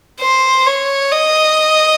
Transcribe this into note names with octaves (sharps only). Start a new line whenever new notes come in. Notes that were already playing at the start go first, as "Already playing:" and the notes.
C5
C#5
D#5